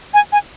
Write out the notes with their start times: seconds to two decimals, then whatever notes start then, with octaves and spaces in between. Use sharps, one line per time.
0.14 G#5
0.32 G#5